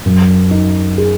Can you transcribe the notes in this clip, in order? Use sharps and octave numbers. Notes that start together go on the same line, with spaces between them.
F#2
D#4
G#4